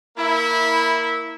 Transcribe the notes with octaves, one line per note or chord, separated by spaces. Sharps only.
A#3 E4